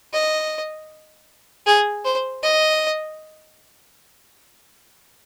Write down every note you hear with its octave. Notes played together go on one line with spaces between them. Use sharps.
D#5
G#4
C5
D#5